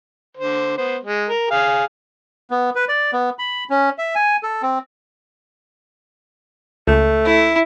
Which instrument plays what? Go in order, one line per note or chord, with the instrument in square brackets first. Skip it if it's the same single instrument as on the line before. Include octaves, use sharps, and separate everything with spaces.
[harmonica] D3 C5
B3 C5
G#3
A#4
G#4 F5
[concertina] B3
B4
D5
B3
B5
C#4
E5
G#5
A4
C4
[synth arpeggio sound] C#2 [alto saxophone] A3
[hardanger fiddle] E4